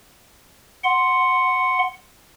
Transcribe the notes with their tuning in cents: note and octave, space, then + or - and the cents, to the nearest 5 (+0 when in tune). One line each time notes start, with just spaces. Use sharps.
F#5 +0 C6 +0